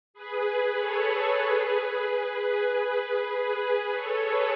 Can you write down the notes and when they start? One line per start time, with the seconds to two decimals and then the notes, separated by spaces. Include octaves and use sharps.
0.14 G#4 B4
0.77 A4 C#5
1.40 G#4 B4
2.03 G#4 B4
2.66 G#4 B4
3.29 G#4 B4
3.61 G#4 B4
3.91 A4 C#5
4.23 G#4 B4